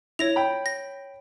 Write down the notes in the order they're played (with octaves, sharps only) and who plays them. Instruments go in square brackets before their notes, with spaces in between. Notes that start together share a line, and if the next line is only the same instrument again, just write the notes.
[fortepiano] E4 [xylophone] C#5 A#6 F7
[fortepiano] G5 B5
[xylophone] A#6